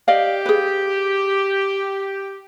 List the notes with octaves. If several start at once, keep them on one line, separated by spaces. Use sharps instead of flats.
G4 D5 D#5 F5
G#4 B4